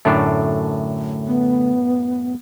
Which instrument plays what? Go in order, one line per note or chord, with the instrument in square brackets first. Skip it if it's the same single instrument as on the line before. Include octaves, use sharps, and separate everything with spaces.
[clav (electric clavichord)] F#2 A2 D4 [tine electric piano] D3 A3
[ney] B3